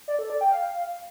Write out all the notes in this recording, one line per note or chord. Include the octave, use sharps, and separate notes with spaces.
D5
A4
D5
G5
F5